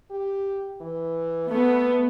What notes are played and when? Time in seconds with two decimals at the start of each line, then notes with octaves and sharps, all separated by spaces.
0.11 G4
0.81 E3
1.51 A3 B3